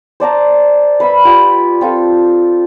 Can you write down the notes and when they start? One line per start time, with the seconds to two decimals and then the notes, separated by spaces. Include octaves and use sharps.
0.20 C5 D5 A5 A#5
1.00 B4 E5 B5
1.25 F4 G4
1.81 C4 F4 A4